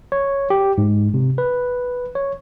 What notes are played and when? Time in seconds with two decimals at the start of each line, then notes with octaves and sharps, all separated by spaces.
0.12 C#5
0.50 G4
0.78 G#2
1.14 C3
1.38 B4
2.15 C#5